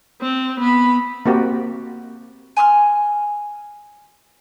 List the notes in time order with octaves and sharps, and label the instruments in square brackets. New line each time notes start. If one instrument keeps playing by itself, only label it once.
[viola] C4
B3 B5
[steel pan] A#3 C4 F#4 G4
[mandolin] G#5 C6 D#6 F6